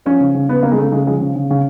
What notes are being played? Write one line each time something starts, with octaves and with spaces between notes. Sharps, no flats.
F3 C#4
C#3
C#3
C#3 B3
C#3 A#3
G#3
C#3 A3
C#3 G#3
F3 G#3
C#3
C#3
C#3